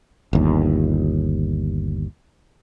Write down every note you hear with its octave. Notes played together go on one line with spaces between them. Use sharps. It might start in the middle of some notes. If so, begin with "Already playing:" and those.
G1 D#2